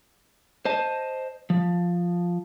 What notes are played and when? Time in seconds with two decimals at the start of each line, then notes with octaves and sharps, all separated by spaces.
0.65 C5 D#5 A5
1.50 F3